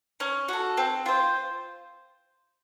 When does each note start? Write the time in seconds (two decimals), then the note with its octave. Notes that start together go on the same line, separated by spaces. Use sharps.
0.20 C#4
0.48 F#4 A4
0.77 C4
1.06 F4 C5